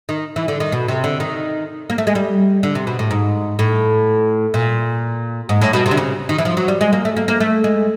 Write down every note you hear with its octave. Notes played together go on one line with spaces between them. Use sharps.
D#3
E3
D3
D#3
B2
C3
D3
D#3
A#3
A3
G#3
G3
D3
C3
B2
A2
G#2
A2
A#2
G#2
A2
B2
C3
D3
C#3
D#3
E3
F3
F#3
G3
G#3
A#3
A3
A#3
A#3
A3
G#3